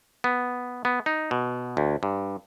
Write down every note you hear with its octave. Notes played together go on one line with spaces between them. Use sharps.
B3
B3
D#4
B2
D2
G2